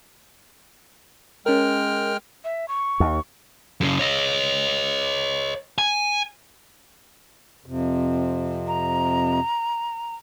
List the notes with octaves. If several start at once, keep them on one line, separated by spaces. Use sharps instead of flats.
G#3 C#4 A#4 G5 F6
E5
C#6
D#2
F#2 C#3
C#5 D#5
G#5
F2 C3
A#5